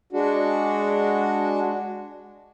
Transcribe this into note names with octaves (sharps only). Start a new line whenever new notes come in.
G#3 D4 F#4